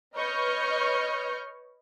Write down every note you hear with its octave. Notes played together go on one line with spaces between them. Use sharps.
B4 C#5 D#5 C#6 F6 G6